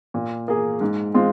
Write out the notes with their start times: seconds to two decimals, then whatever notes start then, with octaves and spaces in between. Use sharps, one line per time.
0.14 A#2
0.48 A#3 G#4
0.81 G#2
1.14 G#3 C4 F4